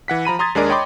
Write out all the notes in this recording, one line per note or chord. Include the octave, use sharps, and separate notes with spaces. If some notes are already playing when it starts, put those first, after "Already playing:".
E3 F#5 B6
F3 A#5 B5 D#7
A#5 C6 D#6 G#6 A6
D#2 G#3 D4 G#4 A#4 D5
C#5 D#5 G5 B5 C6 D6